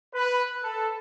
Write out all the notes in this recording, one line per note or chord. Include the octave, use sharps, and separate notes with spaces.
B4
A4